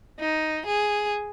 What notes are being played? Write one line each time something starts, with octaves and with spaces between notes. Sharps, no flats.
D#4
G#4